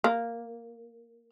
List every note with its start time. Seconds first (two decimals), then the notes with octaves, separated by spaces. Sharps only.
0.04 A#3